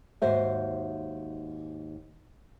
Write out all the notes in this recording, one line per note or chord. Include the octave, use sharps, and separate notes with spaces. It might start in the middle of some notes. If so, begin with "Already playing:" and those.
D#2 G#2 F#4 C5 E5